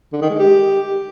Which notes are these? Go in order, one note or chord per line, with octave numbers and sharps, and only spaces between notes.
D3
D#3
G#3
G4